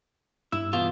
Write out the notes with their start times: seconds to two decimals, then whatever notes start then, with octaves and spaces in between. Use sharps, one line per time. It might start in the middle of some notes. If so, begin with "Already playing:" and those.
0.52 G2 E4 E6
0.73 E2 B2 F4